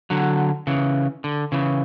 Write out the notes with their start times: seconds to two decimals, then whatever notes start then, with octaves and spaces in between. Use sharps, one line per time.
0.10 D3 F#3
0.67 C#3 E3
1.24 D3
1.52 C#3 E3